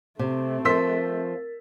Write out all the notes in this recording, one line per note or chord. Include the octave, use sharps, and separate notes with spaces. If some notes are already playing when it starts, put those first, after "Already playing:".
C3 A3 C4
F3 A#4 C6 E6 A6 B6